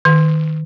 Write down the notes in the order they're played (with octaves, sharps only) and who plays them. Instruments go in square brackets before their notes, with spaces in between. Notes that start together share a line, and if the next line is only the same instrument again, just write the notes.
[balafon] D#3